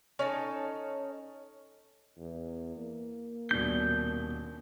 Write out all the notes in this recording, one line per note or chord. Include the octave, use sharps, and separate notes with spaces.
C#4 D#4 A4
E2
A#3
D#1 B2 D4 G6